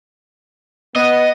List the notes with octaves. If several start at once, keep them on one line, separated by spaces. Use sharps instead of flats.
B3 D#5